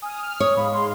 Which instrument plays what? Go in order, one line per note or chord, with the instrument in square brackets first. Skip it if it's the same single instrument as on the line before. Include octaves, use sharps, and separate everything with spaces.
[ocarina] G#5 [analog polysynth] D#6 F6
[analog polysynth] F6
[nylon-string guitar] C#5 [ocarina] D#6
[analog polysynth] G#2 G#3 F5 [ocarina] B5
[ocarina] C6